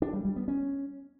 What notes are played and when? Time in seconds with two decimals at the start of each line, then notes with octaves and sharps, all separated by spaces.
0.02 D4
0.13 G3
0.25 G3
0.36 B3
0.48 C#4